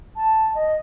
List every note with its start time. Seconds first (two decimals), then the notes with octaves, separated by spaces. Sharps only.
0.16 A5
0.55 D#5